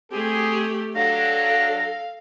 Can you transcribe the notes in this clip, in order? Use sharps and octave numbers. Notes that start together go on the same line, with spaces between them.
A3 C4 G4 G#4
F#3 D4 A4 F5 A#6